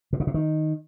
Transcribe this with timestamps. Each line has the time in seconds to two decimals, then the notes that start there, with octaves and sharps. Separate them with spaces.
0.13 C3
0.20 C#3
0.27 C3
0.34 D#3